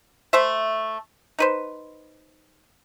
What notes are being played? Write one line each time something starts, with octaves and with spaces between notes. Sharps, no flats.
A3 C5 E5
D#4 B4 C5